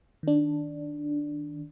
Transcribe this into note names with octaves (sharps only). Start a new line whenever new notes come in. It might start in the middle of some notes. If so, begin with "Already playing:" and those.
D#3 D4